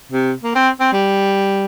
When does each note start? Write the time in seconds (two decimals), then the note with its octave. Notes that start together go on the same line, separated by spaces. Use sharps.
0.12 C3
0.43 A#3
0.55 C4
0.80 C4
0.93 G3